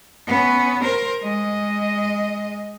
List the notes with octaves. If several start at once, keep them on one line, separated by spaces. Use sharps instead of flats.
B3 C#4
A#4 C5
G#3 D#5